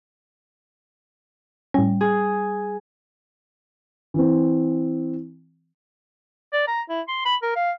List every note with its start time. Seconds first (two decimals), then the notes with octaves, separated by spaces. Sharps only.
1.74 A2 G3 C#4
2.01 G#4
4.14 E3 C4
6.53 D5
6.68 A#5
6.89 E4
7.08 C6
7.25 B5
7.43 A#4
7.56 F5